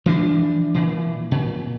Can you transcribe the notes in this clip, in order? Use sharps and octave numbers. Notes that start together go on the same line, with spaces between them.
E3 F3 C4 D4
A#2 E3
A#2